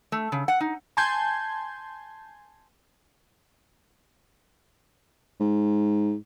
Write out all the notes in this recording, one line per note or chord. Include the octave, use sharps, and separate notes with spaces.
A3
C#3
F#5
D#4
G#5 A5 C6 G6 G#6
G#2